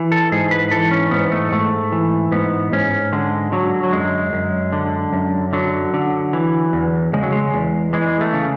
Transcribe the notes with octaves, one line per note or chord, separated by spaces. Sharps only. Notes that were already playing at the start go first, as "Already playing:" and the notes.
Already playing: E3
A4
G#2 G#4
B4
E3 A4
C#4
G#2 B3
A3
G#2 A3
E3
G#2 B3
G#2 C#4
D3 G#3
D3 F#3
F#3
F#2 G#3
F#2
D3
F#2
D3 F#3
D3
E3
E2
C#3 G#3
F#3
G#3
E2
E3 G#3
A3
C#3